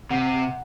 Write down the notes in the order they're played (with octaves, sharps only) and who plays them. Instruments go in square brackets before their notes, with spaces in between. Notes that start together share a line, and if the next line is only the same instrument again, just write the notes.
[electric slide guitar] C3 [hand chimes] F#5